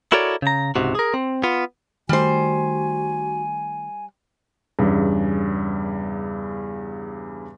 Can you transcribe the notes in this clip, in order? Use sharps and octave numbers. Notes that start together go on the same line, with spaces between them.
E4 F#4 A4 A#4 C#5 D5
C#3 A#5
C#2 G#2 C3 F#4
G#4 A#4
C4
B3 F4
D#3 G3 A3 F#4 C5 G#5
E2 G2 C#3